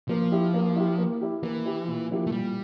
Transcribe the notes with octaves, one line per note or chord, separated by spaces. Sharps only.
F3 A#3
E4 G4
A#3
E4 G4
A#3
E4 G4
E3 A#3
E4 G4
A#2
F3 A#3 E4 G4
A3
A#2 G3